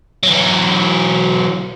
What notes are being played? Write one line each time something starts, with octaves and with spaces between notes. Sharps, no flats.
E3 F#3